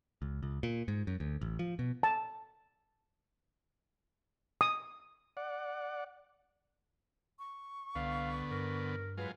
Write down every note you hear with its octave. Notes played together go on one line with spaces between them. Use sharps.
C#2
C#2
A#2
G#2
F#2
D2
A1
F3
B2
A5
D#6
D5 F#5
C#6
C2 D3 B3 F5
G2 A#4
F#3 G#3 F4 B4